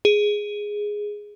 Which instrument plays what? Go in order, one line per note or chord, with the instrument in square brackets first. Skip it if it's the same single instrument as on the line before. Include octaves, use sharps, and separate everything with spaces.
[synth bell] G#4